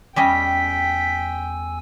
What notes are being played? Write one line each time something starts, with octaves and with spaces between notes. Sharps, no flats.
E2 G3 C#4 D#5 G5 G#5 E6 B6